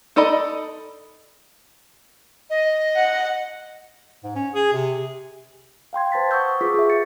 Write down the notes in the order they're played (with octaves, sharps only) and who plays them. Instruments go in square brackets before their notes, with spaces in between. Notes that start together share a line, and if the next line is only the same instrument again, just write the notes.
[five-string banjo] D#4 A4 D5 D#5 B5
[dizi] D#5
[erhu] F#5
[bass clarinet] G#2
C#4
G#4
C3
[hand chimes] F5 G5 C6 G#6
B4 C5 A5 A6 B6
F#5 C#6 D#6 E6 G6
F4 G#4 B4 C#6 D6 B6
G#4 B4 E5
A6 C#7